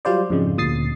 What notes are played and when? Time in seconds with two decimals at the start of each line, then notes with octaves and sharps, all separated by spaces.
0.05 F#3 G3 F4 C5 D5
0.30 F2 G#2 C#3 G#3
0.58 D2 A#2 D#6 A6 C7